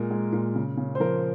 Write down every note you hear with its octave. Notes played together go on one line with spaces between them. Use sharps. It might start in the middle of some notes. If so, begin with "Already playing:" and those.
Already playing: A#2 G#3 A#4
G#3
A#2
C#3
C#3
C5
F3 A#4